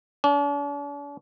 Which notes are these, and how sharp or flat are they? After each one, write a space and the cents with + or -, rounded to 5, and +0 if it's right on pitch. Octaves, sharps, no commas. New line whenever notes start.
D4 -45